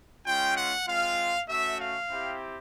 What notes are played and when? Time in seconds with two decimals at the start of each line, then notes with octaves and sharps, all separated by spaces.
0.25 G#3 C#4 F4 G5
0.57 F#5
0.87 G#3 C4 F4 F5
1.48 A3 C#4 F#4 E5
1.80 F5
2.10 C4 E4 G4